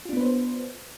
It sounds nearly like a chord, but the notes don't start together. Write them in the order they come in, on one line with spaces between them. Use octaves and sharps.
F4 D4 B3 B4 C5